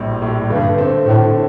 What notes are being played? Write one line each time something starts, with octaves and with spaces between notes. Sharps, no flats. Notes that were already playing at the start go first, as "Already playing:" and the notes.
Already playing: A#1 A2 G3
A2 G3
G2 D3
A3 C4
A2 D3